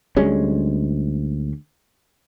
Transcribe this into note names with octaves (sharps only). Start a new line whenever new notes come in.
D2 G3 G#3 C#4